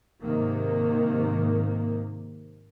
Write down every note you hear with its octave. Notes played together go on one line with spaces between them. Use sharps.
G#2 C3 D#3 A#3